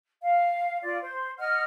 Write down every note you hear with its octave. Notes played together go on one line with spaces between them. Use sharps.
F5
F4 D5
C5
D#5 F#5 F6